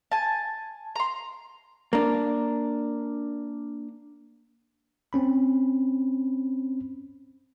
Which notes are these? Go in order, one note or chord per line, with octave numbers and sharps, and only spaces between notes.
G#5 A5
A#5 C6
A#3 D4
C4 C#4 B5